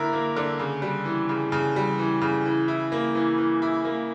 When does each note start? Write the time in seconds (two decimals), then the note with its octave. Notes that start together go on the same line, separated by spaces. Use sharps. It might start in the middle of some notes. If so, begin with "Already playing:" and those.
Already playing: D3 A#3 E4 A#4
0.13 A#3
0.37 D3
0.59 C#3
0.82 G3
1.05 E3
1.29 C#3
1.52 C#3
1.76 G3
1.99 E3
2.22 C#3
2.45 E3
2.68 E4
2.92 A#3
3.15 E3
3.38 E3
3.62 E4
3.85 A#3